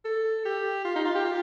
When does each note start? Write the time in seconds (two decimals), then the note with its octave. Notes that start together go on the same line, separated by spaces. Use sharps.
0.05 A4
0.45 G4
0.85 F4
0.96 D#4
1.05 F4
1.15 G4
1.25 F4